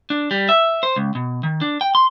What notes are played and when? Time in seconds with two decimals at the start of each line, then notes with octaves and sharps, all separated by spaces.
0.10 D4
0.31 G3
0.49 E5
0.83 C5
0.96 C#2
1.15 B2
1.43 D#3
1.61 D4
1.81 G5
1.95 C6